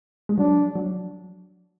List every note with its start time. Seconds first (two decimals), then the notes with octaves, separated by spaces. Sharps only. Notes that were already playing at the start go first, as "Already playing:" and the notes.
0.29 G#3
0.38 F#3 D4
0.75 F#3